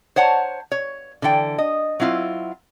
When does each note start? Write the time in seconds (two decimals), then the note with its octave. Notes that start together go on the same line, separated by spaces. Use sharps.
0.16 C5 C#5 F#5 A5 A#5
0.72 C#5
1.22 D3 E3 A4 G5
1.58 D#5
2.00 F#3 C4 E4 F4